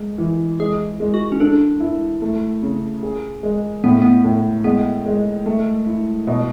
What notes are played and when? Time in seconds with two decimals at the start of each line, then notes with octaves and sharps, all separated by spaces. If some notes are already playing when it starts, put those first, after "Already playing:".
Already playing: G#3
0.18 E3
0.60 G#3 G#4
1.00 G#3
1.14 F#4
1.32 C#4
1.40 D4 A4
1.80 E4
2.22 A3
2.62 C#3
3.03 G#4
3.43 G#3
3.84 A2 B3
4.02 B3
4.24 A2
4.64 G#3 B3
5.06 G#3
5.46 A3
5.87 E4
6.27 B2